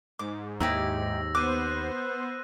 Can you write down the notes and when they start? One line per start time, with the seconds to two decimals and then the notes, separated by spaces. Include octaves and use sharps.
0.19 G#2 D6
0.60 D#2 D#4 E4 G4 E6 A#6
1.35 B3 C5 D6 F#6 D#7